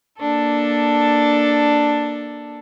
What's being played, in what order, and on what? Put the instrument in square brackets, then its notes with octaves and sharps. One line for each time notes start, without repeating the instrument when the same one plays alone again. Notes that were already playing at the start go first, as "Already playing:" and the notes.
[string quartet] A#3 D4 A4